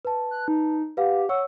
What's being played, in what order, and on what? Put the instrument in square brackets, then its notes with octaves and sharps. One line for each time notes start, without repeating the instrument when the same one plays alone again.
[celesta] B4 A5
[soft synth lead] F#6
D#4
[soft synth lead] G4 [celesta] B4 F5 F#5
[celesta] C#5 C#6 E6 [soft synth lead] F#5